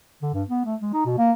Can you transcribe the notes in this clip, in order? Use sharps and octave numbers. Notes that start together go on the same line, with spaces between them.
D3
G2
B3
A3
G#3
D#4
B2
A#3